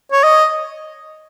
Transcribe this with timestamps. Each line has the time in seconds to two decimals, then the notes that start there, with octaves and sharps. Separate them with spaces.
0.12 C#5
0.24 D#5